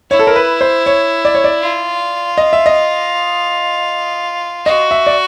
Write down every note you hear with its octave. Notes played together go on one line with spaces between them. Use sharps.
E4 C#5
A4
A#4
B4
C5
C#5
D5
C#5
D5
F4
D#5
E5
D#5
F#4 D#5
E5
D5